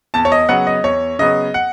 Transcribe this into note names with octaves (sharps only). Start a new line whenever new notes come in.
E2 A5
C#5
D#5
C#3 F#3 B3 F#5
D#5
E2 C#5
C#3 F#3 B3 D#5
F#5